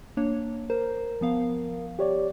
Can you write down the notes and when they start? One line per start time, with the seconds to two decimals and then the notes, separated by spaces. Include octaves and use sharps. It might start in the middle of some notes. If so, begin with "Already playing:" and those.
0.17 A#3 D4 C#5
0.70 A#4 C5
1.21 F3 B3 F5
1.99 G4 C#5 D5